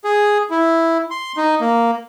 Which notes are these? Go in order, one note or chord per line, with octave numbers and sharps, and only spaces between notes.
G#4
E4
C6
D#4
A#3